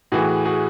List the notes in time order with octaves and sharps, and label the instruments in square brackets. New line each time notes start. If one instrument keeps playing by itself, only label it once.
[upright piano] A2 E3 F#4 G#4
F#4 G#4